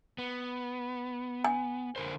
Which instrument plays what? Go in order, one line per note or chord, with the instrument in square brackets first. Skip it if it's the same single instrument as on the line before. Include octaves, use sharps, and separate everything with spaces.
[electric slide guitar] B3
[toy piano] G#5
[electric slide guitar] D3 A#4 C5